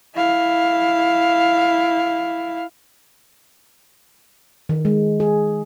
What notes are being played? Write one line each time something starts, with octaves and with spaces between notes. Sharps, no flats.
E4 F5
D#3
G#3
G#4